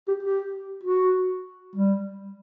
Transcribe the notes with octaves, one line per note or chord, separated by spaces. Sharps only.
G4
G4
F#4
G3